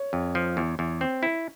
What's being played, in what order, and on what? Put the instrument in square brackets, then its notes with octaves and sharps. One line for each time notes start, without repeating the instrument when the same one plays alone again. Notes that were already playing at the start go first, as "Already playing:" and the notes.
Already playing: [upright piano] C#5
[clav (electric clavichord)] F2
F3
E2
E2
C4
E4